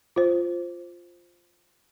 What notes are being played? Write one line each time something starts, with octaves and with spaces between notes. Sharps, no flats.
F4 C5